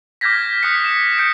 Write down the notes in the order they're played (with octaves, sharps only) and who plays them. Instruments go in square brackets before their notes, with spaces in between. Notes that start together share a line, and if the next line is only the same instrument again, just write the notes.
[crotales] D6 F6 G6 G#6 A#6 B6
D#6 F#6 B6 C#7
E7
G6 C#7 D7